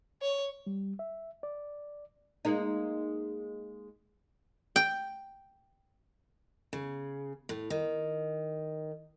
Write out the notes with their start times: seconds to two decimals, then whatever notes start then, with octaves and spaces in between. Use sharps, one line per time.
0.22 C#5
0.66 G3
0.99 E5
1.43 D5
2.45 G#3 A#3 D#4
4.76 G5
6.73 C#3
7.49 A2
7.70 D#3